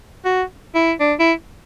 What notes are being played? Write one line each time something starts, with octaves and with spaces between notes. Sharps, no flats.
F#4
E4
D4
E4